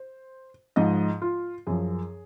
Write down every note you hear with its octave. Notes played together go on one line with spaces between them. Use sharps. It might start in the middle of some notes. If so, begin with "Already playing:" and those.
Already playing: C5
G#2 F3 D#5
F4
F#2 F3 G#4